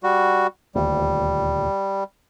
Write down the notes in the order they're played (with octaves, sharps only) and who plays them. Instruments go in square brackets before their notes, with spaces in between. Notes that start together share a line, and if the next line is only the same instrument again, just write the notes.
[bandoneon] G3 F#4
[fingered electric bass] D#1 D2 [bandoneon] G3